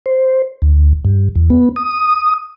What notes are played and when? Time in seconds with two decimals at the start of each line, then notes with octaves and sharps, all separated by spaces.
0.06 C5
0.62 D2
1.05 G2
1.36 E2
1.50 B3
1.76 D#6